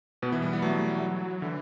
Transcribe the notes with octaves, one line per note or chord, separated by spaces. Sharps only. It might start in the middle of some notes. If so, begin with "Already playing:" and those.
B2 B3
E3
G3
G3 B3
F#3 A3
F#3
D3 E3